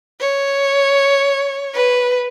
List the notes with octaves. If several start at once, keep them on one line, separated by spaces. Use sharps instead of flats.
C#5
B4